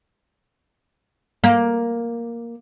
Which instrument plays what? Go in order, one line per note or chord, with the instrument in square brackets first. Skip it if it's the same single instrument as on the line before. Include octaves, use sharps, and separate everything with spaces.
[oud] A#3